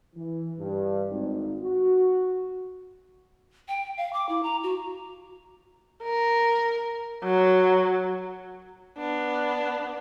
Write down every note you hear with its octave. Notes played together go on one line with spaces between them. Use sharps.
E3
G2
G#1
F#4
G5
F5
D6
E4
A#5
F#4
A#4
F#3
B3 D4